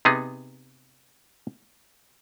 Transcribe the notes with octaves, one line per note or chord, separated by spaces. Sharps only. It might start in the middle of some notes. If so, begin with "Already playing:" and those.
C3 B3 D#4 G#4